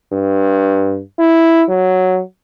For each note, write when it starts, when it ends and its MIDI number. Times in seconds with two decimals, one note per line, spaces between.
0.12 1.01 43
1.19 1.63 64
1.69 2.21 54